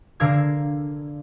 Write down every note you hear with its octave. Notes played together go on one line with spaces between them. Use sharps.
D3 A#4 F5 E6 G#6